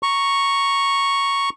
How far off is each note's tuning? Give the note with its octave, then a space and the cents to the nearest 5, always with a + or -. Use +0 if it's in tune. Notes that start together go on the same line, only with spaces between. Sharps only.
A#5 +0 C#6 +0